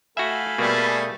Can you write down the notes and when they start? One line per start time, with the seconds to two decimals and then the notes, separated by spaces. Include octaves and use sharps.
0.17 A3 F#4 E5 F5 G#5 B5
0.58 B2 G3 A3 A#3 G#4 A4